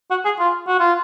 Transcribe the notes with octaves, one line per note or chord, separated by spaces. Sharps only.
F#4
G#4
F4
F#4
F4